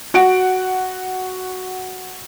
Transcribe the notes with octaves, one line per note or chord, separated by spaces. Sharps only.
F#4 F#5 D7